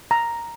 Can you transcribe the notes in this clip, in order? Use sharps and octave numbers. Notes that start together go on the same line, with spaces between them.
A#5